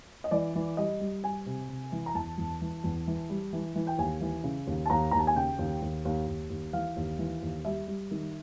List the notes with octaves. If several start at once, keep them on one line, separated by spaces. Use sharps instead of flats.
D#5
E3 D5
E3
G3 D#5
G3
G3 G#5
C3
C3
E3
A#5
E2 A5
E2
E3
E2
E3
G3
E3
E3
G5
D#2 G#5
E3
C#3
D#2
A5
D#2 A#5
D#2 A#5
A5
G#5
C#3 G5
D#2
D#2
D#2
D#2
D#2
E3 F5
D#2
E3
D#2
G3 E5
G3
D#3